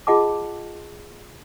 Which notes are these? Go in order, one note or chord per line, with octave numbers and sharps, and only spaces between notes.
F4 G#4 D#5 F#5 A5 D6